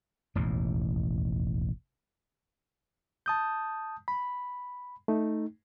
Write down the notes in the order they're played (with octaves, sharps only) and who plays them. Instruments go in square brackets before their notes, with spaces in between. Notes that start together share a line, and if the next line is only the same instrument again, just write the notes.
[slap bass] E1 A1 D#2 A2
[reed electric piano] A5 D#6 G6
B5
A3 D#4